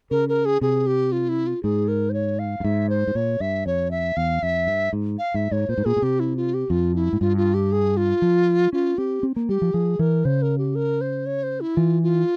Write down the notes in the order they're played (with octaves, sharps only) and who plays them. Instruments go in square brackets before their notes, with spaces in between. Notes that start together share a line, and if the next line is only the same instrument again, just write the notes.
[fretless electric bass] C#3 [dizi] A#4
[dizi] A#4
G#4
[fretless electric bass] C3 [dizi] G#4
[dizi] G4
F4
E4
F4
[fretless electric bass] G#2 [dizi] G#4
[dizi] A#4
C5
C#5
F5
[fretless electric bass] G2
[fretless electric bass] G#2 [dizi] E5
[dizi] C5
[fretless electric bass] G#2
[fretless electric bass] A#2 [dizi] C#5
[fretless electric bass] G2 [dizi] E5
[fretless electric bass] F2 [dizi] C#5
[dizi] E5
[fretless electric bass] E2 [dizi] F5
[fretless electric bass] F2 [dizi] E5
[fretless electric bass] G2
G#2
[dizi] F5
[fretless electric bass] G#2 [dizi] E5
[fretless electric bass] G#2 [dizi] C#5
[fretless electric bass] A#2 [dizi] C5
[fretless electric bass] G#2
[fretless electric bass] A#2 [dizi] G#4
[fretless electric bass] A#2
[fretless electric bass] C3 [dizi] G4
[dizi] E4
F4
G4
[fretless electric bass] F2 [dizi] F4
[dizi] E4
[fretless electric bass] G#2
[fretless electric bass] G2 [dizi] F4
[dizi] F4
G4
G#4
F4
[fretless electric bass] F3
[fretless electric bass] C#4 [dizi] F4
[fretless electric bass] C4 [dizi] G4
[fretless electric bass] C4
A#3
[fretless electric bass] G3 [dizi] G4
[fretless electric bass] F3
[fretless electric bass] F3 [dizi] G#4
[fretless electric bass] E3 [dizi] A#4
[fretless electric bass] C#3 [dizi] C5
[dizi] A#4
G4
A#4
C5
C#5
C5
E4
[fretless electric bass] E3 [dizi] F4
[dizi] F4